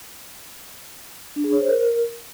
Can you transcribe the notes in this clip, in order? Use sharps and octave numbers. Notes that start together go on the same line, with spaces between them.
D4
G#4
C#5
C5
A#4